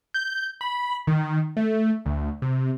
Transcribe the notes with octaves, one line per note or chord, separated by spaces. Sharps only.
G6
B5
D#3
A3
D2
C3